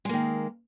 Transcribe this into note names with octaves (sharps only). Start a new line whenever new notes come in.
D#3 G#3 A#3